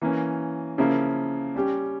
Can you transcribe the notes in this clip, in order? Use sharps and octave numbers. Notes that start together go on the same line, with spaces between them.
E3 A#3 C#4
C#3 F3 A#3 E4
G3 C#4 G4